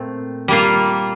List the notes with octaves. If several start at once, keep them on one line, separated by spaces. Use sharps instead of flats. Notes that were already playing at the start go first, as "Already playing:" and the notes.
Already playing: A#2 A3 C4
G3 A#3 F4